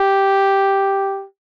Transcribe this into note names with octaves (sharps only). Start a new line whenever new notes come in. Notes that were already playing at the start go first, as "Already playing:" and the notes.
Already playing: G4